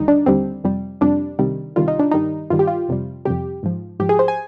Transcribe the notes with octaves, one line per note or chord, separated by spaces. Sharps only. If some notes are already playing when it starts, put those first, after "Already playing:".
Already playing: D#2 D3 G3 D#4
D4
D#2 D3 G3 C4
F2 C3 G3
F2 C3 G3 D4
C2 C3 D#3 G3
C2 C3 D#3 G3 F4
D#4
D4
G2 D#3 G3 D#4
G2 D#3 G3 F4
G4
F4
F2 C3 G3
F2 C3 G3 G4
G#2 F3
G#2 F3 G4
G#4
C5
G#5